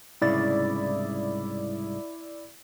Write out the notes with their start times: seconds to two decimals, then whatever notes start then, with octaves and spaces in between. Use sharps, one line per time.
0.22 C2 G#2 C#3 E4 D5 A6